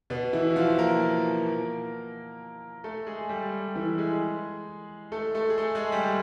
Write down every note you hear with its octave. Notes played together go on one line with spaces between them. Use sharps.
B2 B3
E3 E4
F#4
F3 F4
A#3 A#4
A3 A4
G#3 G#4
G3 G4
E3 E4
G#3 G#4
A3 A4
A3 A4
G#4
A3 A4
G#3 G#4
G3 G4